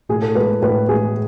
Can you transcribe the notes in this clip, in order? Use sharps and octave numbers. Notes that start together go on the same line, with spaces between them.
A2 G#4
A4
G#3 B4
A2 B4
G#3 G#4